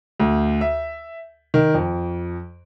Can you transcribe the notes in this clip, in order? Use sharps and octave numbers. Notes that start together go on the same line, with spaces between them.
D2
E5
D#3
F2